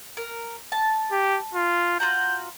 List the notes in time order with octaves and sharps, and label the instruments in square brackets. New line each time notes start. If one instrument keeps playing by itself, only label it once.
[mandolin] A#4
A5
[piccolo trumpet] G4
F4
[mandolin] F4 F#4 A#5 [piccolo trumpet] G6